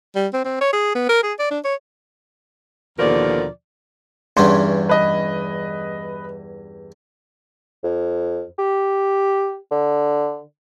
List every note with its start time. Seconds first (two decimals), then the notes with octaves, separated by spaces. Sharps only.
0.16 G3
0.33 C4
0.45 C4
0.61 C#5
0.73 G#4
0.95 B3
1.09 A#4
1.23 G#4
1.39 D5
1.51 D4
1.64 C#5
2.99 D#2 B2 D3 F3 A#4 D5
4.37 E2 G2 C#4 C6
4.89 B4 D#5
7.84 F2
8.58 G4
9.71 D3